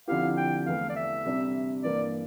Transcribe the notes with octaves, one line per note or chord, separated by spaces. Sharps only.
D3 F3 C4 E4 G4 F5
G5
E2 E3 A3 F5
D5
E5
C3 G3 D4 G4
G2 E3 A#3 D5